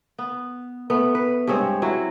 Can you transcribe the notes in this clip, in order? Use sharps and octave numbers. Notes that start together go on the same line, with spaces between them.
B3
A3 B3
B4
G2 G#3 C4 C#5
F#3 E4 F#4